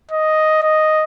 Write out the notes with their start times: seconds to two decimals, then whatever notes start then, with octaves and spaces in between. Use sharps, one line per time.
0.11 D#5
0.62 D#5